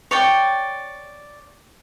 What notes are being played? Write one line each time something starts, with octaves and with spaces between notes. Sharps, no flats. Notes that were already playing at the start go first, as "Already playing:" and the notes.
C#5 D5 G5